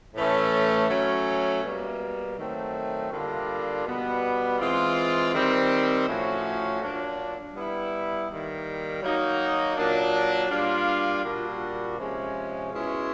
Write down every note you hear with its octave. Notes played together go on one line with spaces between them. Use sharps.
A2 E3 A3 C#4
F#3 A3 C#4
B2 G3 A#3
D#3 F#3 A3 C4
D3 G3 A#3 D4 F4
B2 G3 B3
E3 G#3 C4 F4
D#3 G3 C4
A2 F3 A3 C#4 F#4
F#3 A#3 D4 F4
G3 B3 E4
D#3 G3 A#3
F#3 A#3 D#4 F#4
A#2 F#3 A#3 D4
G3 A#3 D4 F4
A#2 G3 A#3 D4 F#4
C3 F3 G#3 C#4
B2 G#3 C#4 E4